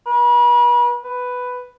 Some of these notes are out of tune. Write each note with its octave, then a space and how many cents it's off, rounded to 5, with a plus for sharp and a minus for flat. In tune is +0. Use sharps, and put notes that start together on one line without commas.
B4 -40
B4 +5